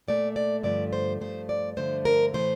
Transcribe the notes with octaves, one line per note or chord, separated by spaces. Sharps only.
A#2 A3 D5
D5
G2 D3 F3 A3 D5
C5
G2 F3 A3 C5
D5
G2 D3 F3 A3 C5
A#4
A2 E3 A3 C5